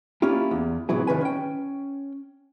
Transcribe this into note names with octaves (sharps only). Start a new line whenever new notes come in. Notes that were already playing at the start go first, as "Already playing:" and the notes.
A#3 C#4 E4 F4 G4
E2
A2 C3 E3 F#3 E4 G#4
A2 D#3 A#3 B4 G#5
C#4 G5